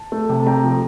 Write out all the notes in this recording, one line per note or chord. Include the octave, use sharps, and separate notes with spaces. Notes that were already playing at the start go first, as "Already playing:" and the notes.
Already playing: A5
A3
C3
A3 G5 A#5
F3